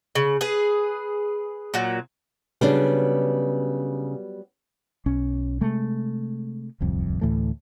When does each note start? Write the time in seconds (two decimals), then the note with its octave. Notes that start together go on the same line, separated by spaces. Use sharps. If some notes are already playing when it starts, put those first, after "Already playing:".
0.15 C#3
0.41 G#4 B4
1.74 A#2 F#3
2.61 C#3 F#3 G3 B3 D4
5.06 B1 C#4
5.61 C3 G#3 A3
6.80 D1 C2 F2
7.21 D2 A2 E3 A3